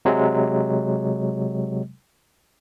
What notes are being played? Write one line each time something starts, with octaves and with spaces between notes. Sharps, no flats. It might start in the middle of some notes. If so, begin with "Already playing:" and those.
C3 F#3 G#3